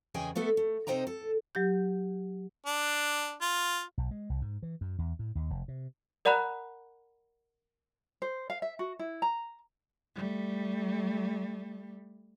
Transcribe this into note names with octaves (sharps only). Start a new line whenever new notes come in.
E2 C#3 G#4 D#5 G5 G#5
A3 B3 A4 E5
A3
C3 D#4 C5 D#5 G5 A#5
A4
F#3 G4 G6
D4
F4
B1
G#3
C2
G#2
E3
F#2
E2
A2
D#2
F1
C3
A#4 D5 F#5 A#5 B5 F#6
C5
F5
E5
F#4
E4
A#5
G3 A3